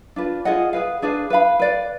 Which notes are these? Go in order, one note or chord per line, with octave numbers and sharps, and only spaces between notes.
D4 F4 B4
F4 G#4 D#5 F#5
G#4 B4 F5
D4 G#4 B4 F5
B4 F5 B5
B4 D5 F5